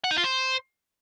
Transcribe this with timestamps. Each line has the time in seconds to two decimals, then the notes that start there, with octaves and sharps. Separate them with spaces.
0.04 F#5
0.11 D#4
0.18 F4
0.24 C5